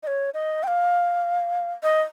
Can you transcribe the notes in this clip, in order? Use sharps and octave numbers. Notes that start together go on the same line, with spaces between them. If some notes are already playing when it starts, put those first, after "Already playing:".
D#5
C#5
D#5
G5
F5
D#5